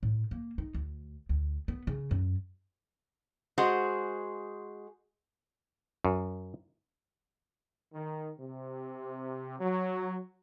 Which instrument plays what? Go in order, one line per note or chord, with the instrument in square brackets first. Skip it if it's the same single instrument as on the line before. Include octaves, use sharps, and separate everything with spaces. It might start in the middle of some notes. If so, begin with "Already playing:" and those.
[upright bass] A2
A#3
D#4
D2
D2
B3
C#3
F#2
[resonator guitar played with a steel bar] G#3 F#4 G#4 C5
[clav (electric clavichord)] F#2
[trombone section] D#3
C3
F#3